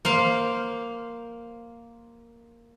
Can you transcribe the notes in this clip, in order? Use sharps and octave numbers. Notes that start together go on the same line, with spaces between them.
A#3 C5 F5